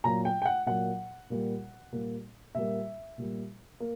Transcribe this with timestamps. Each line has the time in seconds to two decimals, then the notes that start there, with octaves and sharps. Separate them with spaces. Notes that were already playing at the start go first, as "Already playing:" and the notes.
0.04 A#2 F#3 A#3 A#5
0.25 G5
0.42 G5
0.46 F#5
0.66 A#2 F#3 A#3 F#5
1.30 A#2 G3 A#3
1.92 A#2 G3 A#3
2.55 A#2 G3 A#3 E5
3.18 A#2 G3 A#3
3.80 A#3